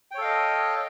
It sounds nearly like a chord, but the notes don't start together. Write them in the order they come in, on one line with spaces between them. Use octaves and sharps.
G5 C#5 A4 F5 D#5